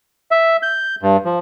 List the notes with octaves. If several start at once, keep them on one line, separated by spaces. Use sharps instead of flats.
E5
G6
G2
F3